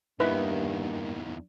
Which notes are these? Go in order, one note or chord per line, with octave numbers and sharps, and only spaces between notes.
E2 G2 D#3 A#3 D#4 E4 B4